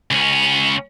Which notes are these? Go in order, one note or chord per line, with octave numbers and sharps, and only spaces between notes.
C#2 C#4